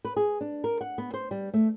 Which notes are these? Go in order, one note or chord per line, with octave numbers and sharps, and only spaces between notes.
B4
G#4
D4
A#4
F#5
B3
C5
G3
A3